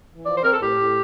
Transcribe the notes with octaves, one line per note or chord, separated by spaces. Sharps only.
E3
F3 D5
C5
C4 A#4
A4
A2 G4
A2